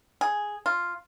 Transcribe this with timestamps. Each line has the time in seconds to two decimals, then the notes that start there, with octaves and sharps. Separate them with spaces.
0.21 G#4
0.66 F4